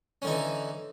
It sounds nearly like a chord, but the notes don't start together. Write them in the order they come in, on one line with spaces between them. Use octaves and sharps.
C#4 D3 D#4 E3